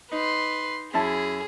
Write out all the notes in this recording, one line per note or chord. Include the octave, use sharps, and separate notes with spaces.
D#4 B4 C6
F#2 E4 G#4 A5